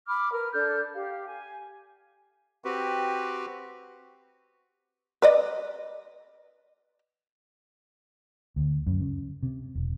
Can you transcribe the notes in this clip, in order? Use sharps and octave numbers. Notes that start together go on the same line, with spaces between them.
B5 D6 F6
A#4 B4 F6
D4 A4 F6 G6
G4 F5
G#5
C4 F#4 G4 B4
B4 D5 D#5
D2
F#2
C#3
C3
E1